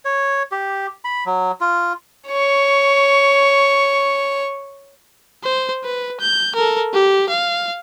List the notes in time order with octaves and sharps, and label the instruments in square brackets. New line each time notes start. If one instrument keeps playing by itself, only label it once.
[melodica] C#5
G4
B5
F#3
F4
[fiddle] C#5 C#6
[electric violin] C5
B4
G6
A4 A#4
G4
F5